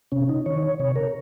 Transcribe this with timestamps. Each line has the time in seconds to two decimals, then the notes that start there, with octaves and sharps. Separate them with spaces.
0.12 C3 C#4
0.29 D#4
0.46 D#3 C#5
0.63 C#5
0.80 C3 C#5
0.96 A#4